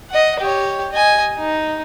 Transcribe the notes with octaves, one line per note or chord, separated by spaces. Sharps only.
D#5 F#5
G4 C#5
D#5 G#5
D#4